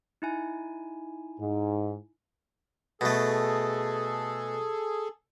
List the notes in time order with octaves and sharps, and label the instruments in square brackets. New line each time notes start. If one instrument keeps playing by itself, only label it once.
[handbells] D#4 E4 G#5
[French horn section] G#2
[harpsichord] B2 A3 [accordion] G#4 A4